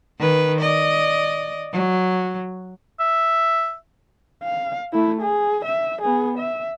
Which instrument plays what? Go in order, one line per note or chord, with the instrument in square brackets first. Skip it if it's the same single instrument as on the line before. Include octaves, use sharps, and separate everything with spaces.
[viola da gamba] D#3 B4
D5 D#5
F#3
[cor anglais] E5
[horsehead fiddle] F5
A3 E4
G#4
E5
B3 G#4
E5